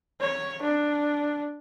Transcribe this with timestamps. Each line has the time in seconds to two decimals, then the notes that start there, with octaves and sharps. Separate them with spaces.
0.21 C#5
0.62 D4